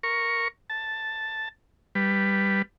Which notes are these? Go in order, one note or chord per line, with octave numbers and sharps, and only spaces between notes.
A#4 C#6
A5
G3 B4